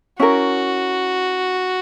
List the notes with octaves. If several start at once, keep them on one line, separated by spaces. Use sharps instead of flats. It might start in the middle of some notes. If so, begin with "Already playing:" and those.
C#4 E4 F#4 A#4